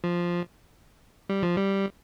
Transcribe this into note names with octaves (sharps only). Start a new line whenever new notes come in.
F3
G3
F3
G3